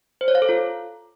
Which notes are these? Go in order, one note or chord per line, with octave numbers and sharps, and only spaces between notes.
C5
C#5
F5
A4
F4